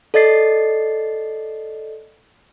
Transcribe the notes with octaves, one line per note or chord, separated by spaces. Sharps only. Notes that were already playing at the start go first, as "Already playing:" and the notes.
A4 D5 D#5 A6 C7